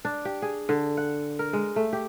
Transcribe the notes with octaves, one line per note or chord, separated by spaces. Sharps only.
D4
G4
G#4
D3
F#5
A#4
G#3
A3
G4